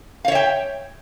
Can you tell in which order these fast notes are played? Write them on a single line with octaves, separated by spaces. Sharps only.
F5 C#5 E5 G5